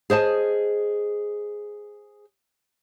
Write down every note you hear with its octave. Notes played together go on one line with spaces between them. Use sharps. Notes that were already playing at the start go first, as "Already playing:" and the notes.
G#4 C5 D#5 A5